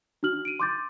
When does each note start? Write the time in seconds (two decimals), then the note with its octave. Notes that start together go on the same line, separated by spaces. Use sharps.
0.23 D4 F#4 F6 F#7
0.45 D7 D#7
0.60 C6 D6 G6 A6